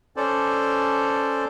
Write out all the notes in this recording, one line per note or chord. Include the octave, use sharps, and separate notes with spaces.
C#4 A4 C5 D5